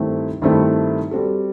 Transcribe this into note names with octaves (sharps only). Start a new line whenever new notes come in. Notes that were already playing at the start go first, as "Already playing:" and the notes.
Already playing: G2 D#3 A3 C4 E4
G2 D#3 A3 C4 E4
G3 C4 F#4 A4